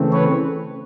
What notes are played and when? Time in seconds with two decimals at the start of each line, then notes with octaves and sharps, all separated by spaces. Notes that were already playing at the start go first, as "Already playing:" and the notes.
Already playing: C#3 E3 A3 C4
0.13 B4 C#5